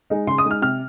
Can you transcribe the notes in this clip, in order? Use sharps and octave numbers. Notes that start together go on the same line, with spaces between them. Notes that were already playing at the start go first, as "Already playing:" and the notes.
G#3 D#4
C#3 C6
D#6
G#3 D#4
F6
C3 F6